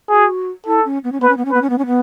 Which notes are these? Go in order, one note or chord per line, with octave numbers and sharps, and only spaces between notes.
F#4 G#4
E4 A4
C#4
B3
C#4
B3 B4
C#4
B3
C#4
B3 B4
C#4
B3
C#4
B3